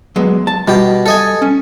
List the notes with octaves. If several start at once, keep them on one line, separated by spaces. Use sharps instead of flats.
F#3 G#3 B3
A5
B2 G3 G4
A4 D#5 G#5
C#4